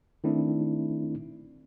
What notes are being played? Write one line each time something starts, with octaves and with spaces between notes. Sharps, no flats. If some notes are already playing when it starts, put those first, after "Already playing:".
D#3 A3 C4 D4 E4